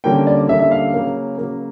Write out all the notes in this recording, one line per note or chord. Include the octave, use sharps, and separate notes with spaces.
D3 G3 A#3 C#4 G5
D5
D3 G3 A#3 C#4 E5
E5
F5
C#3 F#3 A#3
C#3 F#3 A#3